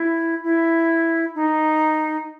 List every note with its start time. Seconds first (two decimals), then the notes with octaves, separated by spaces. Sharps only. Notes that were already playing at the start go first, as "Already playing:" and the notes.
Already playing: E4
0.44 E4
1.35 D#4